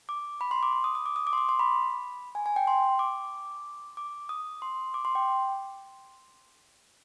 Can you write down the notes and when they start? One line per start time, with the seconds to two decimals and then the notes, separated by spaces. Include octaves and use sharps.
0.09 D6
0.41 B5
0.51 C6
0.63 D6
0.73 D6
0.84 D#6
0.95 D#6
1.06 D6
1.16 D#6
1.27 D6
1.33 C6
1.38 D6
1.49 C6
1.59 B5
2.35 G#5
2.46 G#5
2.56 G5
2.67 C6
2.99 D6
3.97 D6
4.29 D#6
4.62 C6
4.94 D6
5.05 C6
5.15 G5